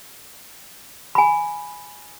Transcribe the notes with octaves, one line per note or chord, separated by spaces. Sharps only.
G#5 B5